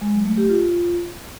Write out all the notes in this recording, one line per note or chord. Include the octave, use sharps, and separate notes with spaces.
G#3
F#3
A3
G4
F4